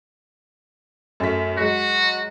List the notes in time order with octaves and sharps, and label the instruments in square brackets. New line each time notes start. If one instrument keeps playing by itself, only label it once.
[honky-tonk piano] F#2 A3 B6
[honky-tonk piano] F#3 G#3 [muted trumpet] F#4